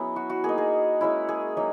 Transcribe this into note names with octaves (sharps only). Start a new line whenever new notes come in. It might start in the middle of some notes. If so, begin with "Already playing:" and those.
Already playing: F#3 B3 C#4 E4 G#4
F#4
F#4
A#3 D#4 G#4
G#4
G#3 C#4 E4
G#4
F#3 A#3 D#4